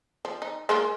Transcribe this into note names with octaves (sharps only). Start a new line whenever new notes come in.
F3
D#4
G#3 A#3 F4